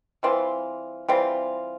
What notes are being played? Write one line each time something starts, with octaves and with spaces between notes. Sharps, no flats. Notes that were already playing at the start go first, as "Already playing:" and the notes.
E3 G3 C4 F4
E3 G3 C4 F4